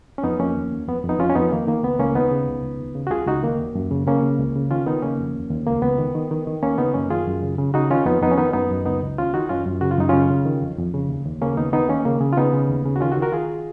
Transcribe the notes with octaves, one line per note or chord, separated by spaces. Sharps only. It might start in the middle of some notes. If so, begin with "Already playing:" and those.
C#4
F2 B3 D#4
F2 A#3 C#4
D#2
D#2
F2 B3
F2
B3 D#4
F2 C#4 F4
C#4
F2 B3 D#4
D#3 A#3
D#3 A#3
C#2 B3
C#2 A#3 C#4
D#2 B3 D#4
C#3
C#2
C#2
D#2
C#3
F#4
C#2 F4 G#4
C#2 D#4 F#4
D#3 A#3
D#2
F#2
C#3
C#3 A#3 C#4
C#3
C#2
C#3
D#3 C#4 F4
D#3 B3 D#4
C#3 A#3 C#4
F2
D#2
D#2
C#2 A#3
C#2 B3
D#3
D#3
D#3
D#3
D#2 A#3 C#4
C#3 B3 D#4
F#2 A#3 C#4
D#3 F4 G#4
F#2
C#3
C#3
C#3 D#4 F#4
D#3 C#4 F4
F2 B3 D#4
F2 B3 D#4
C#4
D#3 B3 D#4
F#2 B3 D#4
F#2
C#2 B3 D#4
C#2
D#2 C#4 F4
D#3 D#4 F#4
F#2 C#4 F4
F#2
C#3 F#4
F4
F#2 D#4
C#3 C#4 F4
C#3
D#3
F2
F2
C#3
D#2
D#2
C#3 A#3 C#4
D#2 B3 D#4
D#3 B3 D#4
D#3 A#3 C#4
C#3 A#3
C#3
F4
C#3 B3 D#4
C#3
D#2
C#3
F#4
D#3 C#4 F4
D#3 D#4 F#4
F#4 A#4
D#3 F4 G#4